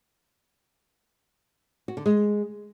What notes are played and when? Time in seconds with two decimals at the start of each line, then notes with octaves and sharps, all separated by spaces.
1.88 F#4
1.97 D3
2.06 G#3